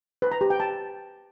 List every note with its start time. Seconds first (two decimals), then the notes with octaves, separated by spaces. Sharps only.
0.22 B4
0.32 A#5
0.41 G4
0.50 G5
0.60 A5